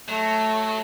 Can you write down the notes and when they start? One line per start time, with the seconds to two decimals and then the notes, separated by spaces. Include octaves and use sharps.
0.08 F#3 A3